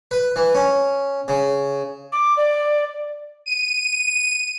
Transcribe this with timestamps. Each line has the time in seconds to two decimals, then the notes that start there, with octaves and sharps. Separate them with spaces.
0.11 B4
0.36 E3
0.55 C#4
1.28 C#3
2.12 D6
2.37 D5
3.46 D#7